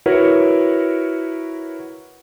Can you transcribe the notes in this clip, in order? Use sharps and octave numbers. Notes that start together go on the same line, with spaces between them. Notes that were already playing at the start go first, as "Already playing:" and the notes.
E4 F#4 A#4 B4 C#5